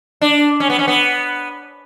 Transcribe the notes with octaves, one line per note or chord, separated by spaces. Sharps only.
D4
C#4
B3
C#4
B3